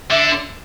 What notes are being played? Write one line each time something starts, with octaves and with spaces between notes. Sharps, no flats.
D3 E5